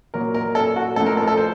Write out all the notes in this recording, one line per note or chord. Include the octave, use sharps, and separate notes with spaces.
A#2 F#3 A#4
A#4
A4
F#4
A2 F3 A4
A#4
A4
A4
C5